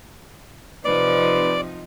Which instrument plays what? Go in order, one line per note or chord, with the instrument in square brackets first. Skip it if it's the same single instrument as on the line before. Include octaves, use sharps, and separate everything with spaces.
[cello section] C3 F3 D#4 [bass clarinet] B4 [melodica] D5